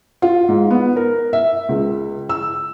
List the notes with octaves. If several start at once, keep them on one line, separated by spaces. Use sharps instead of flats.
F4
G#2
B3
A#4
E5
C#2
E6